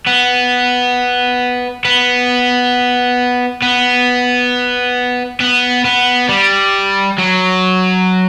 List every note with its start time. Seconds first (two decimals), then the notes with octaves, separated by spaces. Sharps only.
0.06 B3
1.85 B3
3.62 B3
5.40 B3
5.85 B3
6.29 G3
7.18 F#3